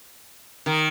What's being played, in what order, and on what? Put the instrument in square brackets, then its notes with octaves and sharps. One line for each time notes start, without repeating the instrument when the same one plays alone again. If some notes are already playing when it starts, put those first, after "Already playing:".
[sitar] D#3